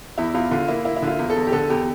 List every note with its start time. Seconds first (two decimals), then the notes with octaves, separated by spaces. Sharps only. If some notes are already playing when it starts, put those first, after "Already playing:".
0.18 E2 E4
0.34 E2 F4
0.51 D3 F4
0.68 A#3 E4
0.85 A#3 E4
0.96 E4
1.02 D3
1.07 F4
1.19 E2
1.30 A4
1.36 E2
1.47 G4
1.52 D3 A4
1.70 E2 G4